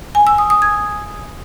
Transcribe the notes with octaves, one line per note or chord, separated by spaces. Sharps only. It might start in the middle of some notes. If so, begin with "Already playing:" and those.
G#5
E6
D#6
D#6
G#6